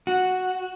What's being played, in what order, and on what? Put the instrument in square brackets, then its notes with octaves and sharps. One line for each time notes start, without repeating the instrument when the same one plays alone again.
[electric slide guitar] F#4